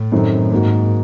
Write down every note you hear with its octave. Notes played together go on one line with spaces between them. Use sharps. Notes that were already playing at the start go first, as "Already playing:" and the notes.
Already playing: A2
F#2 D#3 F#3 A3 C4
G#2 A#3 D#4 F#4